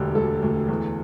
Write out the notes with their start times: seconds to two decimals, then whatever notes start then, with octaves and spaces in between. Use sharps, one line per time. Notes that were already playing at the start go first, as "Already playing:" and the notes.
Already playing: E1 D2 D3 G4
0.15 D2 A4
0.42 D2
0.69 E2